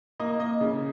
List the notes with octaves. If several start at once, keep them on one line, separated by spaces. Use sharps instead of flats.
A#3 D#5
D#5
C#3